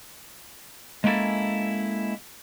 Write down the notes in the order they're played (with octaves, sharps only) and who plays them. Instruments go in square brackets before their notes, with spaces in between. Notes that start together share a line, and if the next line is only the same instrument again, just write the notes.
[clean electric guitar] G#3 A#3 C#4 E4 A4